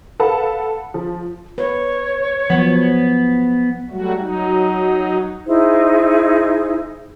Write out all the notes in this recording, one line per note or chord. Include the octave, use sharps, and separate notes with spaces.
A4 B4 F5 F#5 A5 B5
F3
B4 C#5
F3 F#3 B3
F#3 G3 A3 F#4
F#3 D#4
D#4 E4 G#4 C5